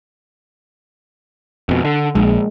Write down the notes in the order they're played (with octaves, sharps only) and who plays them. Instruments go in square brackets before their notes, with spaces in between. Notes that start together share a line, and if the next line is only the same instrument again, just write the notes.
[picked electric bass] F2 B2
D3
[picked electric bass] A#1 [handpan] G#3